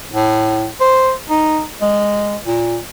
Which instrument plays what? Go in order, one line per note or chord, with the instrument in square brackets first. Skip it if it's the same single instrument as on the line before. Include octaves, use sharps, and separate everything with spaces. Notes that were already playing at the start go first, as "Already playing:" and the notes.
[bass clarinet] A2
C5
D#4
G#3
A#2